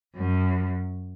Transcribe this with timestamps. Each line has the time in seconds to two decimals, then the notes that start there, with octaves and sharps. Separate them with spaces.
0.16 F#2